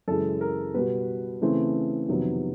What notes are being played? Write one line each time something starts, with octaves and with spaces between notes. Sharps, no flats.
F#2 C#3 E3 G#3 A4
A#4
B2 G3 B3 B4
C#3 E3 A3 C4
F2 C3 D#3 F#3 B3